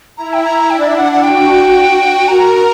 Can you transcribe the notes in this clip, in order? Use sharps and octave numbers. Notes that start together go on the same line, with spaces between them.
E4 A#5
G5
A#5
D4 G5
D5
E5
F#5
F#5
F#4 G5
A#4 A#5
A#5